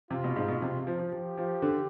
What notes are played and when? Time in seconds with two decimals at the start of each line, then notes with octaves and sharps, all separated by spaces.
0.10 C3 F4
0.24 B2
0.36 G#2
0.48 B2
0.62 C3
0.87 F3
0.99 F3
1.12 F3 G4
1.37 F3
1.62 D3